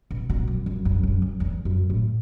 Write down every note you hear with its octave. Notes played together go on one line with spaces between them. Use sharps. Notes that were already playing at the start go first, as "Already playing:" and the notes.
B2
B2
F#2
F#2
F#2
F#2
F#2
E2
F#2
A2